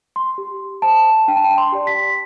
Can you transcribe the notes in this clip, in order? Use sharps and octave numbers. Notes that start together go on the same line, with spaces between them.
C6
G4
C5 A5
D4 G5
A5
G5
C6
G4 D5
B6